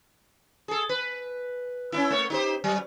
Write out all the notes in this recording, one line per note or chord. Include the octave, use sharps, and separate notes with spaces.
G#4 A4
B4
C#4 D#4 E4
A3 C#5
D#4 G4 C5
F#3